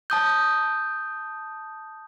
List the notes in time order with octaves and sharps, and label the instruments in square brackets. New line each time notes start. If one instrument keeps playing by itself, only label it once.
[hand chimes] A5 D#6 G6